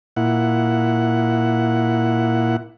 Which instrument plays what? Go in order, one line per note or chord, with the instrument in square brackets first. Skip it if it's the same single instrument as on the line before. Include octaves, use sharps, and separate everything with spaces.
[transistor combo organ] A#2 E4 F#5